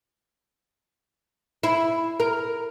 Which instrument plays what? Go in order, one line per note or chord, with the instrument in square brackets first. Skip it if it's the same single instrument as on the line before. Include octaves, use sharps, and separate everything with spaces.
[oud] E4
A#4